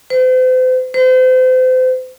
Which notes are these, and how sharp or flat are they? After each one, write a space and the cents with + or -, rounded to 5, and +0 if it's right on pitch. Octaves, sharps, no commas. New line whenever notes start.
C5 -40
C5 -35